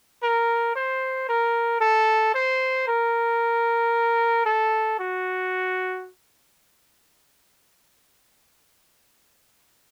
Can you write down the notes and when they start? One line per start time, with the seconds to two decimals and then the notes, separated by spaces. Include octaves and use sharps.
0.22 A#4
0.76 C5
1.28 A#4
1.81 A4
2.34 C5
2.88 A#4
4.46 A4
4.99 F#4